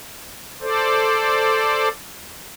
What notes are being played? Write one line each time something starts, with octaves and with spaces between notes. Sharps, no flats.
A4 C5 D5